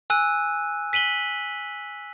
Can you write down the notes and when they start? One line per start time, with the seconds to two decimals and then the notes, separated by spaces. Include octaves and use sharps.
0.10 G#5 E6 F#6 D#7
0.93 B6 D#7 F#7 G7